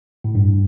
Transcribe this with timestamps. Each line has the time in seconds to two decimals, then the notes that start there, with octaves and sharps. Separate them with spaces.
0.24 A2
0.35 G2